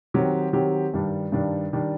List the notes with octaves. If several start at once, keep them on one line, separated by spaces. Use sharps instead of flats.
D#3 F#3 C4 G4
D#3 F#3 C4 G4
G2 D#3 G3 D4
G2 D#3 G3 D4
D#3 G3 D4